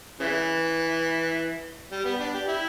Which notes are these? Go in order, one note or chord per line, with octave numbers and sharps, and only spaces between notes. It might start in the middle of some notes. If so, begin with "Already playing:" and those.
C#3 E3
G3
B3
D4
G4
E4